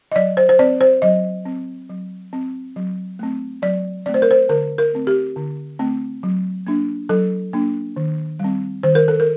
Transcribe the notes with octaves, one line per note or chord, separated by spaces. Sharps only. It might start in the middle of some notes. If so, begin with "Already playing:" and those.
D#5
F#3 D5
C5
C5
C4 D5
C5
F#3 D#5
C4
F#3
C4
F#3
A3 C4
F#3 D5
A3 C4 D5
C5
A#4
C5
D3 A#4
A#4
A3 C4
G4
D3
A3 C4
F#3
A#3 D4
F#3 A4
A#3 D4
D#3
G3 C4
D#3 C5
A#4
A4
A#4